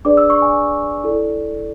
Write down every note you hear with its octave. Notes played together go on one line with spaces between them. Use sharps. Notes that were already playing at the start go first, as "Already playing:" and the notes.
D4 G#4 B4 D5 D6
E6
C#6
G#5
E4 A4 D5